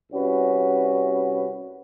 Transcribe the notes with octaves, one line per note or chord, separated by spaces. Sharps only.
C2 C#4 F#4 B4